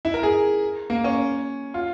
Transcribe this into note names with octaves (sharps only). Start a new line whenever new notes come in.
E4
A#4
G#4
A#3
C#4
F4